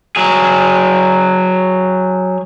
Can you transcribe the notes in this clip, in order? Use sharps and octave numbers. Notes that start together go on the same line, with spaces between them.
F#3 G#4